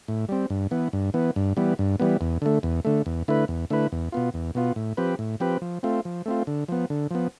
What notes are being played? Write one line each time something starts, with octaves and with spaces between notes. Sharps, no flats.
A2
G3 C4
G2
E3 B3
G2
E3 B3
G2
E3 G3 B3
G2
E3 G3 B3
E2
D3 A3
E2
D3 A3
E2
D3 A3 E4 B4
E2
D3 A3 E4 B4
E2
B2 B3 F4
E2
B2 B3 F4
A2
F3 C4 G4 B4
A2
F3 C4 G4 B4
F3
A3 C4 F4
F3
A3 C4 F4
D3
F3 B3
D3
F3 B3